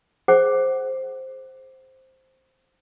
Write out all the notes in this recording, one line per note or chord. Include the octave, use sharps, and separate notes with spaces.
G#4 C5 F#5 D6